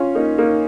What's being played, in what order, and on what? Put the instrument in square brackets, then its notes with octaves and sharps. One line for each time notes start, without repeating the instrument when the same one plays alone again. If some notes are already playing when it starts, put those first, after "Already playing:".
Already playing: [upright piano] C#4 F4
A#3 D#4
A#3 D#4